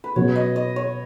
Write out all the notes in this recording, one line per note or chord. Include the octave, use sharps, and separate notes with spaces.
B4
B2 F#3 C#4 C#5
D#5
D#5
C#5